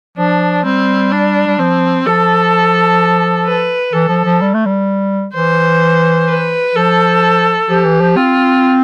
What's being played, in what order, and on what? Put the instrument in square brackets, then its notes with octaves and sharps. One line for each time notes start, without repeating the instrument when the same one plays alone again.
[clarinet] F3 [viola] D4
[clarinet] G3 [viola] C4
[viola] D4
[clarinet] G3
[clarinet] F3 [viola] C4
[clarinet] F3 [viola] A4
[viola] B4
[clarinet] E3 [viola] A4
[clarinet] F3
F3
G3
A3
G3
[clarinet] E3 [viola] C5
[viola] B4
[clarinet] F3 [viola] A4
[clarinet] F3 [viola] G4
[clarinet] E3
F3
[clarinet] C4 [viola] F4